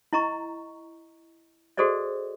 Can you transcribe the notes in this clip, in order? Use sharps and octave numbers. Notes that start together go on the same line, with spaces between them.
E4 D#5 A#5 C#6
F#4 G#4 A4 C5 D5 D#5